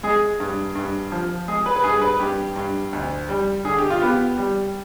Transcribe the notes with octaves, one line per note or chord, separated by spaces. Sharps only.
G#3 G#4
G2
G2
F3
G#3 G#4
B4
B4
G2 G#4
B4
G2 G4
G2
D2
G3
D3 G#4
G4
F4
B3 G4
G3